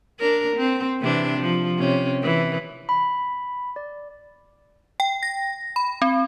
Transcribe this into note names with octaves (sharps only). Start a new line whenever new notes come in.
D4 A#4
C4
C3 E3 D4
F3
C3 C#4
E3
B5
D5
G5
A#6
B5
C4